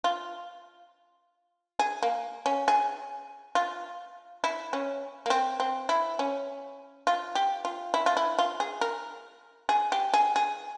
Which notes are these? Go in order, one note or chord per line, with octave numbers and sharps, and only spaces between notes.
F4
G#4
A#3
C#4
G#4
F4
E4
C#4
A#3
C4
C4
E4
C#4
F4
G4
F4
E4
F4
E4
F4
G#4
A#4
G#4
G4
G#4
G#4